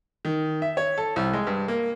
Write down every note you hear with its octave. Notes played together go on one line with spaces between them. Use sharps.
D#3
E5
C#5
A4
C2
G#3
G2
A#3